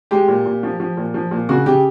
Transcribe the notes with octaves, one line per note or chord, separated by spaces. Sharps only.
G#3 G4
A#2
A#2
F3
F3
A#2
F3
A#2
C#3 F#4
C#3 G4